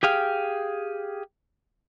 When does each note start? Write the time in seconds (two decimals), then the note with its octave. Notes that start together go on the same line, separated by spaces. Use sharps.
0.03 G4 G#4 F5 G5